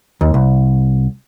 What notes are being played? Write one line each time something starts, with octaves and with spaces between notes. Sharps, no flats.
D#2
C2